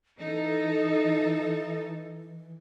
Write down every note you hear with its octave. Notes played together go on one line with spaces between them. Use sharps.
E3 D#4 A4